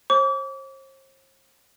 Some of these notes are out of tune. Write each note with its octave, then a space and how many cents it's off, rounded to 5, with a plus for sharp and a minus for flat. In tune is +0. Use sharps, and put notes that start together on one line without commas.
C5 +40 D6 -35